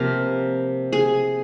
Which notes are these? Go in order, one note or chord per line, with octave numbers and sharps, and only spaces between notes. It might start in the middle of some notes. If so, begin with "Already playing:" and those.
Already playing: C3 F3 A#3 A#4
G#4